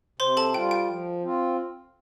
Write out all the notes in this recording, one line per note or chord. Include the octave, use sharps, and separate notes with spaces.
C3 C5 C6
A4 A5
G3 F4 G5
G5
F3
C4 F4